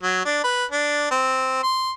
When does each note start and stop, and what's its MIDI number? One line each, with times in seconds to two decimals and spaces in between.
0.03 0.22 54
0.25 0.40 62
0.44 0.65 71
0.71 1.08 62
1.11 1.59 60
1.64 1.91 84